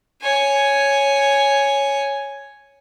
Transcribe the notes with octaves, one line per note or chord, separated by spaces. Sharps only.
C#5 G#5